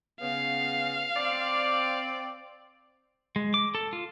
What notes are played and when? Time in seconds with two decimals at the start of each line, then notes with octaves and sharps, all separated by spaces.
0.21 C#3 B3 F5
1.16 C4 D5
3.36 G#3
3.54 D6
3.75 A4
3.93 F4